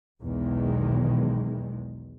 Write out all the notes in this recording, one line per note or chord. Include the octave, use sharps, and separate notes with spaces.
B1 E2 D#3 G#3